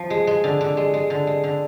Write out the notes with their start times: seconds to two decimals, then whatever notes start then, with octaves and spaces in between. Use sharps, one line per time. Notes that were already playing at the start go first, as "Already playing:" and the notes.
Already playing: F3
0.10 G#3
0.27 G#3
0.44 D3
0.61 D3
0.77 G#3
0.94 G#3
1.10 D3
1.27 G#3
1.44 D3